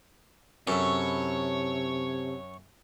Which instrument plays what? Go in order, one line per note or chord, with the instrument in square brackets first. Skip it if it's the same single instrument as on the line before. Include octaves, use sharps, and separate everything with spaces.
[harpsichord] F#2 [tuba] C3 [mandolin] E4 A4 C#6 [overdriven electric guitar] C#5